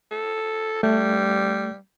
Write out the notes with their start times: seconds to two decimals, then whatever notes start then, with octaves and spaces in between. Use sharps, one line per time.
0.11 A4
0.83 G3 A3